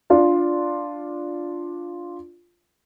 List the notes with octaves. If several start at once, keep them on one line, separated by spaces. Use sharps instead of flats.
D4 F4